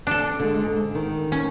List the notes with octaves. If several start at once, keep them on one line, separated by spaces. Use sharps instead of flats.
D4 A4
D3 G#3
G#2
D#3
C#4